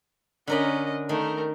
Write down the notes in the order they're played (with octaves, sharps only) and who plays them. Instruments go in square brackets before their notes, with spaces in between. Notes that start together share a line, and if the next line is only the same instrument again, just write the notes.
[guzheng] D3 A#4 B5 [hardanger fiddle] C#4 D#5
[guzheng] D#3 [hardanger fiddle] A3 A#4